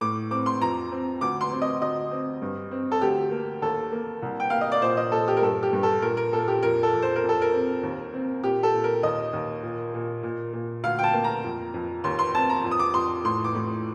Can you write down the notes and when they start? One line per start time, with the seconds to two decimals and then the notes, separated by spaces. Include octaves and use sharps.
0.01 A2 D6
0.31 C4 D6
0.46 C6
0.61 F2 A#5
0.92 C4
1.21 D2 D6
1.41 C6
1.52 C4
1.62 D#5
1.81 D2 D#5
2.11 C4
2.42 G2
2.71 C4
2.92 A4
3.01 D2 G4
3.31 A#3
3.62 D#2 A4
3.92 A#3
4.22 C2
4.40 G5
4.50 A#3 F5
4.61 D#5
4.72 D5
4.82 A#2 C5
4.97 D#5
5.12 A#2 A4
5.28 G4
5.37 A#4
5.42 G2 A4
5.63 G4
5.73 G2
5.83 A4
6.02 A#2 A#4
6.17 A#4
6.33 A#2 A4
6.48 G4
6.63 F2 A#4
6.83 A4
6.93 F2
7.02 C5
7.16 A#4
7.23 F2
7.29 A4
7.42 A#4
7.53 C4
7.83 D#2
8.14 C4
8.43 A#2 G4
8.63 A4
8.73 A#2
8.84 A#4
9.03 D#2 D#5
9.33 D#2
9.63 A#2
9.94 A#2
10.23 A#2
10.53 A#2
10.83 D2 F5
10.99 G5
11.04 A5
11.13 A#3
11.24 A#5
11.44 F2
11.74 F2
12.04 D#2 C6
12.19 C6
12.34 C4 A5
12.50 A#5
12.64 F2
12.71 D#6
12.79 D6
12.94 F2 C6
13.24 A2 C6
13.44 D6
13.55 A2